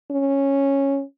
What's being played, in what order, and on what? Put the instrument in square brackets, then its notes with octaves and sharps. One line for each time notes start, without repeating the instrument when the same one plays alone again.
[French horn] C#4